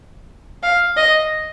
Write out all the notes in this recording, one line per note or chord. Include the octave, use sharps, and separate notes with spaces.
F5
D#5